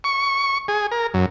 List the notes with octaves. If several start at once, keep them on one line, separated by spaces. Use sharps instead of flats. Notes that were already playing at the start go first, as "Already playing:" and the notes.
C#6
G#4
A#4
F#2